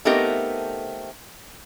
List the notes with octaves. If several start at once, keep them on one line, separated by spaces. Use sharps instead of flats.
A3 B3 C4 D#4 G4 A#4